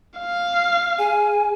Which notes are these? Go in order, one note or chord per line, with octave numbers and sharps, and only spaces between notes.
F5
G#4 G#5